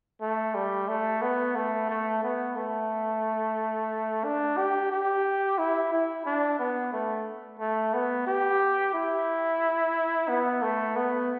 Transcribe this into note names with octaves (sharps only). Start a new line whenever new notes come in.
A3
G3
A3
B3
A3
A3
B3
A3
D4
G4
G4
E4
E4
D4
B3
A3
A3
B3
G4
E4
B3
A3
B3